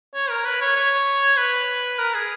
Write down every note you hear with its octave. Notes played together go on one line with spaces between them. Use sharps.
C#5
A#4
B4
C#5
C#5
B4
A#4
G#4